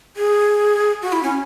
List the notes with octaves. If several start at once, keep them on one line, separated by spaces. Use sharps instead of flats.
G#4
F#4
E4
C#4